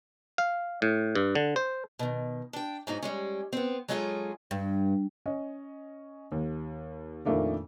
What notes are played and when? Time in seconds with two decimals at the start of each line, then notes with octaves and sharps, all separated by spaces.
0.38 F5
0.82 A2
1.16 G2
1.35 D3
1.56 C5
1.99 B2 D#3
2.53 D4 G5
2.87 G#2 F#3 D#4 F4
3.02 G3 G#3 C#4
3.53 B3 C4
3.88 F#3 G#3 C#4 F4 G#4 A4
4.51 G2
5.26 C#4 D#5
6.32 D#2
7.25 F2 A#2 D#3 A3 A#3 D4